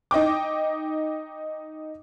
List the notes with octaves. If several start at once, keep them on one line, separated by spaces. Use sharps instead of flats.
D#4 D#5 G5 D6